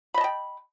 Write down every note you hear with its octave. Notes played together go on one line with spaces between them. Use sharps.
D#5 G5 A5 B5